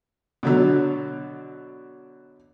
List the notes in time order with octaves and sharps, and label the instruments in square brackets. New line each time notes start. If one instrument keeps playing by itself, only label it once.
[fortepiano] B2 D3 F#3